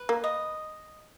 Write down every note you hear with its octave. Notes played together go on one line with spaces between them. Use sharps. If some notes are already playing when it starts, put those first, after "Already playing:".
Already playing: B4
A#3
D#5